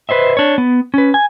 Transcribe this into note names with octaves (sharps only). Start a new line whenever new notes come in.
B4 C5 D#5 E5
D4 C#5
B3
C#4 B4
G#5